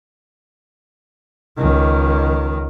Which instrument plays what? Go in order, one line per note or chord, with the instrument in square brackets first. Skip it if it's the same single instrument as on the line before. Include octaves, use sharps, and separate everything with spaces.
[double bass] C#2 D#3